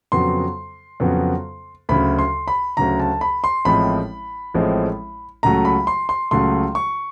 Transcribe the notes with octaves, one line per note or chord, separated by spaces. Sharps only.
F2 C#3 F#3 B3 C6
F2 C#3 F#3 B3
D2 C#3 F#3 B5
C6
B5
D2 C#3 F#3 A#5
A5
B5
C6
A1 A2 F3 G#3 C4 B5
A1 A2 F3 G#3 C4
C#2 C#3 F#3 A3 A#5
B5
C6
C6
C#2 C#3 F#3 A3 C6
C#6